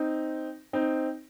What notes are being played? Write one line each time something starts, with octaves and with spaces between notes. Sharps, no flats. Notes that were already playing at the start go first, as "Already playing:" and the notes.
Already playing: C4 D#4
C4 D#4